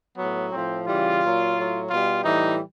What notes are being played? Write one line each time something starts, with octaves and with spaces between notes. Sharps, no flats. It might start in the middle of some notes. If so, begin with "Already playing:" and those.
A2 F#3 B3
A2 F3 C4
C#3 E3 G3 F4
A#2 F#3
A2 F#3
B2 G3 F4
A2 E3 G3 D#4